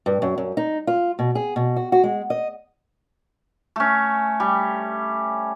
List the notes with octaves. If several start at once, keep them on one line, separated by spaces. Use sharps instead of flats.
G2
F#2
F#2
D#4
F4
B2
G#4
B2
F#4
F#4
G#3
D#5
A3 C#4
G3